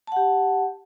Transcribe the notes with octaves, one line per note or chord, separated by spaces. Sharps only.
G4 F#5 A5